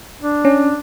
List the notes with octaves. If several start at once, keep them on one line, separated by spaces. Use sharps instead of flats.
D4
C#4